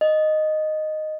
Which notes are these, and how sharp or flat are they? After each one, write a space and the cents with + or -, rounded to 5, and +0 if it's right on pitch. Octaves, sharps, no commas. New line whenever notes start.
D#5 -5